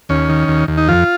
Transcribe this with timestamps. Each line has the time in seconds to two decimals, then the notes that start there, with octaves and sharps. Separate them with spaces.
0.09 D#2 C#4
0.29 D#3
0.48 D#2
0.68 D#2
0.78 D#4
0.88 F2 F4